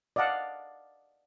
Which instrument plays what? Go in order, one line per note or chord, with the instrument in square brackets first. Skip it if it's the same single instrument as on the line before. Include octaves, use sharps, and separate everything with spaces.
[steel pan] D5 D#5 F5 F#5 A5